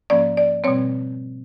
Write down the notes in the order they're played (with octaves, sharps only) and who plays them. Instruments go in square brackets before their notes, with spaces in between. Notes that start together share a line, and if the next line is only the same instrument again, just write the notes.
[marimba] G#2 F3 A#3 C#4 D5
D5
B2 G3 C4 C#5